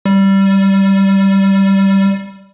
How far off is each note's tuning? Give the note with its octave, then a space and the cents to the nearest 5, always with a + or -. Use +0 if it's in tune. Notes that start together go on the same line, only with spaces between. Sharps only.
G3 -10